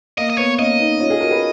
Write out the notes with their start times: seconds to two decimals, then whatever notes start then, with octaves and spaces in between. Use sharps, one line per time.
0.18 A#3 D#5
0.30 D#5
0.38 B3 C#5
0.59 A#3 C#4 D#5
0.79 B3 D#4
1.00 C#4 F4
1.10 F4 G#4
1.20 F#4 A#4
1.31 G#4 B4